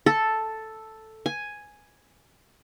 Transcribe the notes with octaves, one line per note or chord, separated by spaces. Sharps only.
A4
G#5